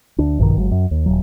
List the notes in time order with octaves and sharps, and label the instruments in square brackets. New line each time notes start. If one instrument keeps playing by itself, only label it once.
[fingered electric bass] D2 D4
A#1 G2 B2 D#3
G1 F#3 G#3
F#2
D#2
D#1 D#2 F#3